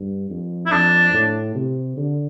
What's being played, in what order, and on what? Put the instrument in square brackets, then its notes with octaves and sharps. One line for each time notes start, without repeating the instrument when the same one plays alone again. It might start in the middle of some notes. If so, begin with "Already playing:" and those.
Already playing: [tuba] G2
F2
[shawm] E4
[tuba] F2 [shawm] D4
[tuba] A2
C3
D3